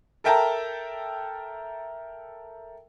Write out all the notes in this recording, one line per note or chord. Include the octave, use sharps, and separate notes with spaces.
A4 A#4 E5 G5 A5 A#5